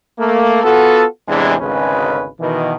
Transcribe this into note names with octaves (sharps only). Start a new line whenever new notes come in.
A3 A#3
B3 F4 F#4 A4
E2 A2 C3 E3 G#3 D4
G#1 D2 C#3 G#3 C#4 B4
B2 D#3 E3